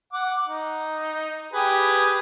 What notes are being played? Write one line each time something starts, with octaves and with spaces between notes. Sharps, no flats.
F#5 D6
D#4
G4 G#4 B4